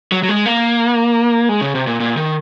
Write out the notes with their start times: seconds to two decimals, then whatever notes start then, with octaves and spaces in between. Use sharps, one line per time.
0.12 F#3
0.23 F#3
0.29 G#3
0.46 A#3
1.49 G#3
1.61 C#3
1.75 C3
1.87 A#2
2.00 A#2
2.17 D#3